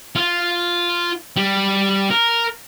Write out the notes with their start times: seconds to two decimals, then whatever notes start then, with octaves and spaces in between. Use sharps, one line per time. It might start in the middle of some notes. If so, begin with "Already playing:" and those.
0.16 F4
1.37 G3
2.10 A#4